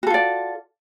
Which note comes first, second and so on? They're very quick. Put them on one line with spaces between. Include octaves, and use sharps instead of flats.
F#4 A4 F4 D5